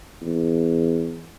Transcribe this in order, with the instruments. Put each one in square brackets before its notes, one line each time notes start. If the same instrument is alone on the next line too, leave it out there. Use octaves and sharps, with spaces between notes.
[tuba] E2